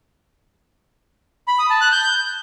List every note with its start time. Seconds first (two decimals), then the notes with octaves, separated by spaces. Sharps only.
1.48 B5
1.59 D#6
1.70 A5
1.81 F#6
1.92 G6